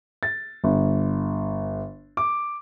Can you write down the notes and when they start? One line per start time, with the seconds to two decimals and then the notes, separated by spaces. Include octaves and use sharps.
0.23 A6
0.64 G1
2.17 D6